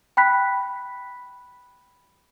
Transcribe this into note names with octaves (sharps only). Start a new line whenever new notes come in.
G5 B5 F#6 B6